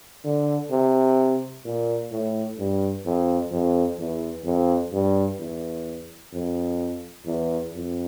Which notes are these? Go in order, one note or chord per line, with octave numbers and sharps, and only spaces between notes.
D3
C3
A#2
A2
G2
F2
F2
E2
F2
G2
E2
F2
E2
F2